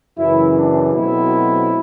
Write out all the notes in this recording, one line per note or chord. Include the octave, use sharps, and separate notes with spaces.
F#2 C#3 E3 E4
D4
B2 F#3 A3 C4 E4